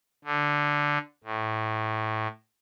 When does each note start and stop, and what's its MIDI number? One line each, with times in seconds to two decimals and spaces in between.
0.24 0.98 50
1.24 2.27 45